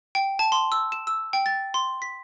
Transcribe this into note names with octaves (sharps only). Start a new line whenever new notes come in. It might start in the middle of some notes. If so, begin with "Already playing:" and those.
G5
A5
C6
E6
E7
E6
G5
A6
C6
B6